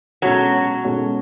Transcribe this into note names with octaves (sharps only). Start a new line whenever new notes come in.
B2 F#3 G#3 C#4 F#4 A4
B2 G#3 C#4 F#4 A4